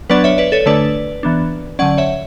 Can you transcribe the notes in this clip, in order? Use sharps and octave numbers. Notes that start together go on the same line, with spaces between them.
F#3 B3 D4 B4 D5
C#5 E5
B4 D5
A4 C#5
D3 A3 D4 B4 D5
E3 B3 D4
D3 F#3 C#4 D5 F#5
C#5 E5